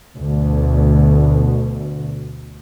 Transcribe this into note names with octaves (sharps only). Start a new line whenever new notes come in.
D2 B2